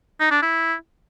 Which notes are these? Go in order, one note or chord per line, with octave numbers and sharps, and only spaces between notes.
D#4
D4
E4